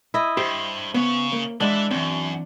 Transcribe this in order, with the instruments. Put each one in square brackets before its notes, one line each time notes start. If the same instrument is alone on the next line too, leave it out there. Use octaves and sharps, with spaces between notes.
[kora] E4 D#5
[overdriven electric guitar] G2 [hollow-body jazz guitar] G4 [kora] C5
[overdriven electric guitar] C#3 C#5 [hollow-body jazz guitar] B3
[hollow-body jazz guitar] A#3
[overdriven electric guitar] E3 E4 [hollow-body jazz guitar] G#3 F#5 C6 [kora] D4
[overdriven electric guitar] F#2 [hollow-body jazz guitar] E3 C4